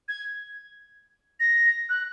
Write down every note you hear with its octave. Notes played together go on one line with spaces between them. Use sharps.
G#6
A#6
F#6